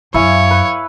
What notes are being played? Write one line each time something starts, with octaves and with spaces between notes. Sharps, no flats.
F#2 E4 C#5 F5 G#5
B4